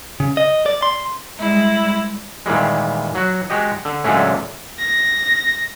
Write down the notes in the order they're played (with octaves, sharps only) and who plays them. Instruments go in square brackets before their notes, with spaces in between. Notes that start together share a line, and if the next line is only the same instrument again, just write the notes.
[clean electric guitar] C#3
D#5
D5
C6
[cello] G3 G#3 [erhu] E4
[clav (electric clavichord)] A#2 D#3 E3 G3 G#3
F#3 F#4
G#3 F#4 G4 D#5
D3
F#2 A#2 D3 G#3 A3 C#4
[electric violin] A#6